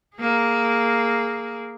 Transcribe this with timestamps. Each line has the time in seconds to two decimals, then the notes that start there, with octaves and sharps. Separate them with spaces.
0.18 A#3 G#4